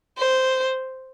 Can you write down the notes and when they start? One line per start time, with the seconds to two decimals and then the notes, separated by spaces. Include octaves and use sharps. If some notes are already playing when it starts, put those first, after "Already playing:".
0.18 C5